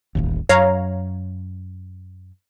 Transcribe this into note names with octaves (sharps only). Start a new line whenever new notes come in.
D#1 A1 D#2
F#2 C#5 F5 A#5